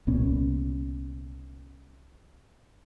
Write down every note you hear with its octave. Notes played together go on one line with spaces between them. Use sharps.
C2 A#2 B3 C#4